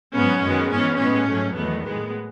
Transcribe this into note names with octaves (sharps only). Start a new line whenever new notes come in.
G#2 F#3 B3 C#4
F#2 D#3 G#3 B3
G#2 E3 B3 C#4
A2 G#3 B3 C#4
G#2 F#3 A3
E2 D#3 F#3 A3 B3
A2 G#3 B3